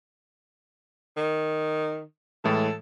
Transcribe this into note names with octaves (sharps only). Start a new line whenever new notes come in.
D#3
A2 E3 G#3 A4